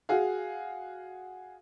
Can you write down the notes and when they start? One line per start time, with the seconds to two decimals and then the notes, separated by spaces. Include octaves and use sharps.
0.09 F#4 G#4 F5